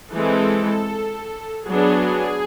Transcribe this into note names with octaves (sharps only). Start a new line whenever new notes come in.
E3 G#3 C4 A4
F#3 B3 D4 G#4